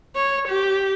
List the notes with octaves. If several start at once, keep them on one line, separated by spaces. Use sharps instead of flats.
C#5
G4